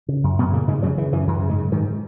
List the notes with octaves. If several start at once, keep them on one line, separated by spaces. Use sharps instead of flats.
C#3
F#2
F#2 B2 B3
A#2 C#3 A#3
G#2 C#3 G#3
F#2 C#3 F#3
C#3 E3
F#2 E3
F#2 E3
C#3
G#2 G#3
C#3
G#2 D#3